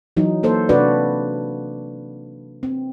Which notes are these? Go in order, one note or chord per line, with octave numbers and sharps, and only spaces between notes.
E3 F#3 D#4
A#3 A4 C5
C3 D4 F#4 B4 D5
C4